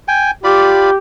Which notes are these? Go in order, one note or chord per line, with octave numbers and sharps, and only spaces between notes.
G5 G#5
F4 G4 D5 B5